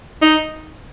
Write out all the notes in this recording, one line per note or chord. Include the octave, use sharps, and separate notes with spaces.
D#4